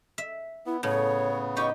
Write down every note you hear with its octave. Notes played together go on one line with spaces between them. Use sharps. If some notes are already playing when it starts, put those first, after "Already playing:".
E5
B3 E4
A2 C#3 B3 C#5
D#4 G4 C#6